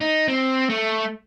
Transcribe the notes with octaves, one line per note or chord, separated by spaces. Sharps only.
D#4
C4
A3